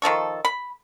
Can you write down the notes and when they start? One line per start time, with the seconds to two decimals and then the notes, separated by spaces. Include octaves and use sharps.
0.02 D#3 F3 A4 C#6
0.45 B5